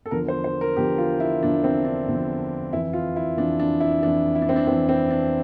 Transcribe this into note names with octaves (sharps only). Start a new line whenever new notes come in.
A4
E2 D3 F3 A#4
C5
C5
A#4
E2 D3 F3 G4
F4
E4
E2 D3 F3 D4
C4
D4
E2 D3 F3
F2 E3 E4
F4
E4
F2 E3 D4
D4
E4
F2 E3 D4
E4
D4
C4
D4
F2 E3 C4
C4
D4